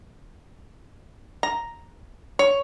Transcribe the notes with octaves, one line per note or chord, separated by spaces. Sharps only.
A#5
C#5